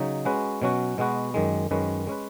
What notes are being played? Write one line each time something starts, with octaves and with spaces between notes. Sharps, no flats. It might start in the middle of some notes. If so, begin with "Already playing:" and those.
Already playing: C#3 F#3 D#4
G#3 C#4 F#4 B4
B2 F#3 C#4 F#4
B2 G#3 B3 F#4 B4
F#2 D#3 G#3
F#2 D#3 G#3 C#4 B4
G#3 C#4 B4